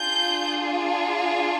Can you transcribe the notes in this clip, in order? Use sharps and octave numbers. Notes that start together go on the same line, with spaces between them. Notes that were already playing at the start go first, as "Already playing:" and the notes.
Already playing: D4 F4 G#4 G6